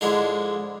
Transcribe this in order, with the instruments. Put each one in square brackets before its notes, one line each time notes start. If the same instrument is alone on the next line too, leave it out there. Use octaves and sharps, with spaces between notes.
[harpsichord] G#2 D3 F3 G#3 E4